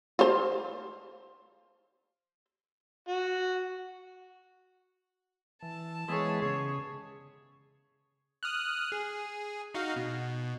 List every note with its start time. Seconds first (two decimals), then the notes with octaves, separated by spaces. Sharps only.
0.19 F4 C5
3.09 F#4
5.63 E3 A5
6.08 E3 G#3 B3 G#4 C#5
6.42 C#3 G#4 C#5
8.43 D#6 F6 F#6
8.92 G#4
9.74 D#4 F#4 F5
9.96 B2